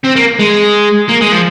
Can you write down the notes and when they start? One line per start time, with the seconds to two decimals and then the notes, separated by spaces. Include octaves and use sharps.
0.04 C4
0.16 A#3
0.40 G#3
1.09 A#3
1.21 G#3
1.32 F3